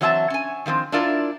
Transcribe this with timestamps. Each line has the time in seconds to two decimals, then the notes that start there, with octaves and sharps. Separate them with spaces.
0.01 E3 F#3 C4 E5 G5 A5
0.30 C#4 G#5
0.66 D#3 F3 G#3 C4
0.92 D4 E4 F4 A#4 D5